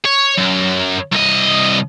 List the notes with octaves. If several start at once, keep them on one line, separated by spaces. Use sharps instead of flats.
C#5
F#2
C2 D#5